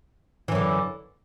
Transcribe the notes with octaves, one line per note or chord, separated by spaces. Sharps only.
F#2 D3 E3